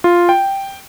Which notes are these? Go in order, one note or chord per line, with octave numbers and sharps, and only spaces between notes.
F4
G5